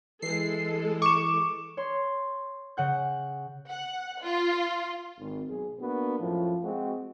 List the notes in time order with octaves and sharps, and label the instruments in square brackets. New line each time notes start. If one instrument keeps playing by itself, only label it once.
[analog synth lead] E3 [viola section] G#3 A4 [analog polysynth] C7
[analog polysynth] C#6 [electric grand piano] D6 E7
[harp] C#5 C6
C#3 F#5 G6
[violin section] F#5
F4
[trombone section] G#1
B1 G#4
A#3 B3 D4 F#4
F#2 A2 F3
G#3 C4 F#4